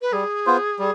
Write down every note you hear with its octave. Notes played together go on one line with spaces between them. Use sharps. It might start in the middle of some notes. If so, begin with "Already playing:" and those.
B4
G3 G#4
B3 F4 C5
G3